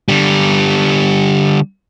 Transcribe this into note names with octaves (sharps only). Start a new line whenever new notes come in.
D3 G3